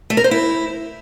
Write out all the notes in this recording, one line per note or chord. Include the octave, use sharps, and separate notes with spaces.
A3
A#4
C5
E4